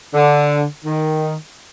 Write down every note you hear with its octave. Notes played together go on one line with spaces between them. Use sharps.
D3
D#3